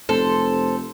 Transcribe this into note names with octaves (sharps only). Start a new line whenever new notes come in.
F1 A4 C5